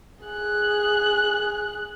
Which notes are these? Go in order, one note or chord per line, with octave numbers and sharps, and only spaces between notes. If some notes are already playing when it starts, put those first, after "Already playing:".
G#4 F#6